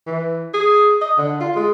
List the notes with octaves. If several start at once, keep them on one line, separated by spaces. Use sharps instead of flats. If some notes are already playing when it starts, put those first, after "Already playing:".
E3
G#4
D#5
D3
F4
G#3